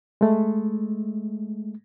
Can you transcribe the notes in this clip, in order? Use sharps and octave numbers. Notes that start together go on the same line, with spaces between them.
G#3 A3